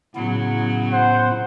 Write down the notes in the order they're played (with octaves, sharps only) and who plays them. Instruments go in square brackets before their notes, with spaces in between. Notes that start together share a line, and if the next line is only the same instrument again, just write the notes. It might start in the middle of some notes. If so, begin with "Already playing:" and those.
[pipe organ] A2 B3 E4 [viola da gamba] C#3 F#3
[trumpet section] C5 F#5